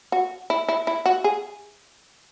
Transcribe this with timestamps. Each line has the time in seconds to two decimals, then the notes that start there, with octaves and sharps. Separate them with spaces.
0.12 F#4
0.50 E4
0.68 E4
0.87 E4
1.06 F#4
1.24 G#4